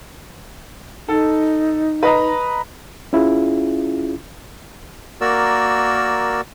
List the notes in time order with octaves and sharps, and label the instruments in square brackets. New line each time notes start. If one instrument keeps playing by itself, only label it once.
[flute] D#4 [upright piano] A4
[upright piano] B4 D#5 A#5
[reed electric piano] C#4 E4 F4 G#4
[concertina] A#3 F#4 A#4 D5 E6